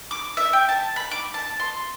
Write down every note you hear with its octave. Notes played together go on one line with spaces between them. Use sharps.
D6
E5
G5
A5
B5
D6
A5
C6